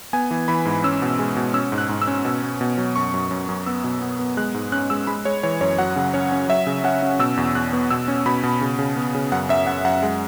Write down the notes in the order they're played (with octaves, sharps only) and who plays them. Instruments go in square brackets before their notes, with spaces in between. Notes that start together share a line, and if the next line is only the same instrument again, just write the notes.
[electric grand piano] B3 G#5
E3
E3 B5
G#2
C#4 E6
B2
G#3
B2
C#4 E6
G#2
F#6
G#2
E6
C#4
B2
B3
B2
F#3
F#2 C#6
F#2
F#2
F#2
B3 E6
B2
B3
B3
G#3 F#6
G#2
C#4 F#6
G#3 E6
G#3 B5
G#3 C#5
E3 C#5
F#2 C#5
F#3 F#5
C#3
C#4 C#5
C#4
F#3 E5
C#3
C#4 F#5
C#4
B2 E6
E2
E2 F#6
B3
B2 E6
C#4
B2 B5
B2
C#3
C#3
B3
C#3
F#2 F#5
F#2 E5
F#2 F#5
F#2 F#5
G#3